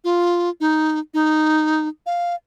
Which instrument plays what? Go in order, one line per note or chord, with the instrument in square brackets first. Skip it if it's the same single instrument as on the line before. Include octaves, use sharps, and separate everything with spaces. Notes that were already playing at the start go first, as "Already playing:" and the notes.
[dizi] F4
D#4
D#4
F5